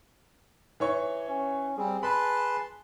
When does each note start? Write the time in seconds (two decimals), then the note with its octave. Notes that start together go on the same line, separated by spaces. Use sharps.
0.80 E3 C#5 C#6
1.28 C#4
1.77 G3 C4 G#4
2.03 B4 A5 B5 C6